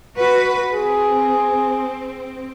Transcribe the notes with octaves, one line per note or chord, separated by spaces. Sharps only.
F#4 B4
C4 G#4